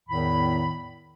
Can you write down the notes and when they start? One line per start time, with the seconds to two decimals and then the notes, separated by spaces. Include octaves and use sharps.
0.09 E2 A2 D#3 B5